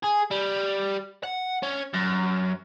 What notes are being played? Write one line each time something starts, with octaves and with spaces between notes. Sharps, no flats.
G#4
G3
F#5
C#4
F#2